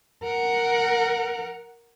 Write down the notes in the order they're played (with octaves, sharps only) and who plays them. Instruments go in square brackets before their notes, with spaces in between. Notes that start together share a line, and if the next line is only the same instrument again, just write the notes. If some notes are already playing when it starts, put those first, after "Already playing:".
[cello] A#4 F#5